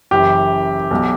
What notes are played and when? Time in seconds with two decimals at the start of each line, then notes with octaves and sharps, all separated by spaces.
0.11 F#1 F#2 E3 G4
0.91 B1 B2 F#3